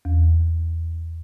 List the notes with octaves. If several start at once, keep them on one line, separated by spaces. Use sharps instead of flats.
E2